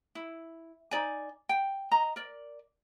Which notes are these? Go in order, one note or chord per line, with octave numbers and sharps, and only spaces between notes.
E4
D#4 D5 G#5
G5
D#5 A#5
A#4 D5